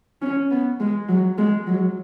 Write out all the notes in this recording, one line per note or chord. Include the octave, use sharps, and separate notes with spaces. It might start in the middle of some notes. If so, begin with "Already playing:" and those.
C#4
B3
G#3
F#3
G#3
F#3